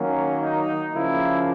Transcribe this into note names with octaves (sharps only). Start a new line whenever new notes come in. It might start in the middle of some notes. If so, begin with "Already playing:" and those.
Already playing: D#3 F#3 A#3 C#4
D#4
C#3 F3 A#3 E4